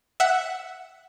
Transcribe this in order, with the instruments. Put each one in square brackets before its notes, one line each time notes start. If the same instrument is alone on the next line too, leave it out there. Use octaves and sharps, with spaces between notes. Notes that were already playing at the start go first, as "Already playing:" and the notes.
[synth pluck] E5 F#5